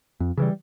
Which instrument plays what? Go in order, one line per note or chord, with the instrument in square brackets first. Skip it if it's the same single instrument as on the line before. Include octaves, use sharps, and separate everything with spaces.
[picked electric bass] F2
C#3 E3 G3